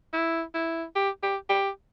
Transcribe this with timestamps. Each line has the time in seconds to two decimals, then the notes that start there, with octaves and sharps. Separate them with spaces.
0.13 E4
0.54 E4
0.95 G4
1.23 G4
1.49 G4